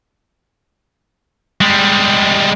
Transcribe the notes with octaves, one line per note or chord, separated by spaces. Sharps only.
G3 G#3